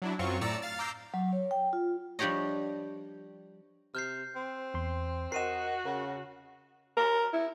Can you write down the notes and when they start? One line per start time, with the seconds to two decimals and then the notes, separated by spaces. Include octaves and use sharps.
0.02 F#3 D4 E4
0.19 F#2 F#3 C4 F4 C#6
0.41 A2 D5 A#5 E6 A6 C#7
0.62 F5 F6 A6
0.79 A#5 D6 E6 G6 C7
1.14 F#3
1.33 C#5
1.51 G5
1.73 F4
2.19 F3 G3 D4 G4 C#5 D#5
3.95 C3 F6 G6 C7
4.36 C4
4.74 E2 C6
5.32 F#4 A#4 D#5 C7 D#7 E7
5.85 C#3 A#4
6.97 A#4
7.33 E4